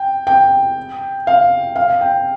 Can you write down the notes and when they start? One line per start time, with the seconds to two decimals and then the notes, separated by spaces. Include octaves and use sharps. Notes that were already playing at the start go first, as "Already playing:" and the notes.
Already playing: G5
0.27 G5
1.27 F5
1.76 F5
2.01 G5